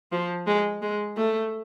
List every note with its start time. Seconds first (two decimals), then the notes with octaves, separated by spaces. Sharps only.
0.12 F3
0.47 G#3
0.82 G#3
1.17 A3